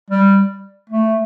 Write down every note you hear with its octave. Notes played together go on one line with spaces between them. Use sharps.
G3
A3